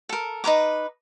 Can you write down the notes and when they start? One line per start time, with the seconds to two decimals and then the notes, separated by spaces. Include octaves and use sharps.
0.09 A4 A#4
0.44 D#4 B4 A#5 D6